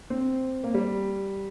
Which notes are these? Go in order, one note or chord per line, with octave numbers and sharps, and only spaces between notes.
C4
A#3
G3